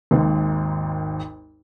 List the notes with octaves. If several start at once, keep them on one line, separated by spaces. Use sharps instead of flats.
G#1 D#2 G#2